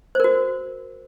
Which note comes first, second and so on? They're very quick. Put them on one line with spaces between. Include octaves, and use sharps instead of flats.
C5 A#4 F#4